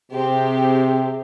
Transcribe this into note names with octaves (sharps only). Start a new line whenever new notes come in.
C3 C4 G4 G#4